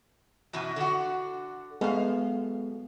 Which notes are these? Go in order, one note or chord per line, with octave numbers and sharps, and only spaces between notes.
F#2 B2 E3
D3 F#4
F#2 G#3 B3 A4 F5